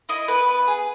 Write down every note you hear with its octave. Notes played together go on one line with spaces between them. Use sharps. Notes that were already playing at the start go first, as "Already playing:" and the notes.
E4 D#5
B3 B4
B3
G#4